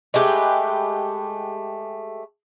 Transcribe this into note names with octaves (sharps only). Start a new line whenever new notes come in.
G#3 A3 G4 B4